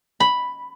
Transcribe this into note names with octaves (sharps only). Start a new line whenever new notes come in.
B5